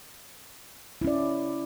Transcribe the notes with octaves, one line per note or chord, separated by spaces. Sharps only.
C#4 E4 D5